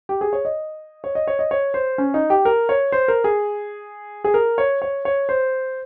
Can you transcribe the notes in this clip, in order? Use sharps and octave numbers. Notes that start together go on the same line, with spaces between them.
G4
G#4
C#5
D#5
C#5
D#5
C#5
D#5
C#5
C5
C#4
D#4
G4
A#4
C#5
C5
A#4
G#4
G#4
A#4
C#5
C#5
C#5
C5